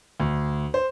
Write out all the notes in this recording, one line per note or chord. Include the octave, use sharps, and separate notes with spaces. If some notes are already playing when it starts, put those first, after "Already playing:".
D2
C5